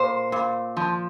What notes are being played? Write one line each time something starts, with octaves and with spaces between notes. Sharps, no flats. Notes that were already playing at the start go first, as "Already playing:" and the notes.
Already playing: A#2 C5
A#2
F3